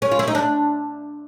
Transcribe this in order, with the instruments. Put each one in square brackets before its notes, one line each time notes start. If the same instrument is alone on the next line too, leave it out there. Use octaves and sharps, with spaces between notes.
[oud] C#4
F4
E4
D#4
D4